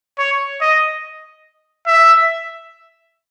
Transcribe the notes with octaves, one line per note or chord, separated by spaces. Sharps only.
C#5
D#5
E5